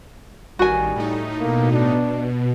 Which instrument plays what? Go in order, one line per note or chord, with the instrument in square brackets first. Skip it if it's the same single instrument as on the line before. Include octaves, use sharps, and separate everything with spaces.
[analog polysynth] A1 D#3 [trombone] G3 [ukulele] F#4 G#5
[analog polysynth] A2 A3 D#4
[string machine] B2 [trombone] A#3
[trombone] D4